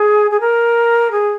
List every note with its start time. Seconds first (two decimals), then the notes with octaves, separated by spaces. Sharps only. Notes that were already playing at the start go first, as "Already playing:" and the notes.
Already playing: G#4
0.31 G#4
0.40 A#4
1.11 G#4